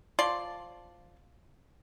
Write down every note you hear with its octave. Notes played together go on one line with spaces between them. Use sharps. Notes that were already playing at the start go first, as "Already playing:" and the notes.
F3 D5 A5 C6